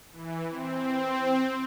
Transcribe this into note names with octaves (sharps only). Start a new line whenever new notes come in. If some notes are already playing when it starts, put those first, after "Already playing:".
E3
C4